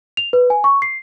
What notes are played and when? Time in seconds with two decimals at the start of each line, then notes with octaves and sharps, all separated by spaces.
0.17 F7
0.33 B4
0.50 G#5
0.64 C#6
0.82 C7